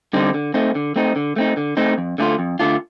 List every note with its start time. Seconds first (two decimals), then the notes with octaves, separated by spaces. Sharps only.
0.13 D3 G3 C4 D#4
0.34 D3
0.54 A3 C4 D#4
0.75 D3
0.96 A3 C4 D#4
1.16 D3
1.36 A3 C4 D#4
1.57 D3
1.77 A3 C4 D#4
1.98 F2
2.18 D3 A3 D4 F4
2.39 F2
2.59 D3 A3 D4 F4